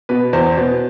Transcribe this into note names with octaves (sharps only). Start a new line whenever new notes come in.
B2 B3 B4
E2 C5
B2 B3